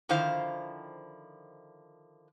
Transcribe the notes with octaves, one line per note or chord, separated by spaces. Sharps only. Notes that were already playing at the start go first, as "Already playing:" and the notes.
D3 D#3 F3 E4 C5 F5